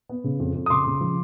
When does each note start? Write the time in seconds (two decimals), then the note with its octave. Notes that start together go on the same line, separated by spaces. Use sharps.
0.09 B3
0.24 C#3
0.40 F2
0.55 F2
0.66 D#6
0.70 C#3 C6 D6
0.86 C#3
1.01 F3